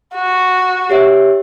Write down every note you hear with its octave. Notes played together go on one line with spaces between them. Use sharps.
F#4
G4 C#5 E5